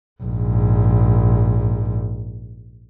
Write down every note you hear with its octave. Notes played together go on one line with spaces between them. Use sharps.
A#1 G#2